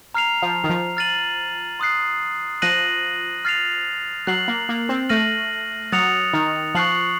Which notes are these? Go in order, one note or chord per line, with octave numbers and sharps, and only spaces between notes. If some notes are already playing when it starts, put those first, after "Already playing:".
A#5 F6 C7 F7
F3
D#3
F3
F6 A6 D#7 F#7
C6 D#6 F#6 C7
F3 F#6 A#6 D#7 F#7
F6 A6 C7 F7
F#3 F#6 C7 F#7
A#3
A#3
C4
A3 F6 A#6 D#7 F#7
F#3 D#6 F#6 A6 C#7 F7
D#3
F3 C#6 F#6 C7 F#7